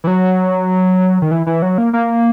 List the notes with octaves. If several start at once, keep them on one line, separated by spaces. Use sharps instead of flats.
E3
F#3
D#3
E3
E3
F#3
A#3
A#3